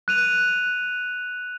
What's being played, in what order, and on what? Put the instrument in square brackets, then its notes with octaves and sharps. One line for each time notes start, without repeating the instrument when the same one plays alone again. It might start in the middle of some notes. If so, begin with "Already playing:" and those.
[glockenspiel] F#6 D#7 F7